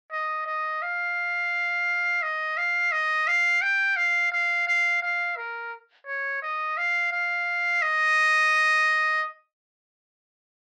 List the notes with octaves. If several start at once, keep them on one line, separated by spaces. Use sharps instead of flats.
D#5
D#5
F5
D#5
F5
D#5
F5
G5
F5
F5
F5
F5
A#4
C#5
D#5
F5
F5
D#5